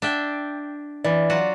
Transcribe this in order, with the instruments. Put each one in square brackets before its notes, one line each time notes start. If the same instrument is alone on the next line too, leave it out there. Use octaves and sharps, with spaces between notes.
[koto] D4 E5 G5
[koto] E3 [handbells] D5
[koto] F#3 F4 F#4